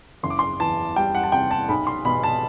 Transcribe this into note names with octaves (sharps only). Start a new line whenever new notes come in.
F#1 C6
D6
C6
E2 A5
G3 G5
F#5
A5
C3 G5
A5
B1 B5
C6
B2 B5
A5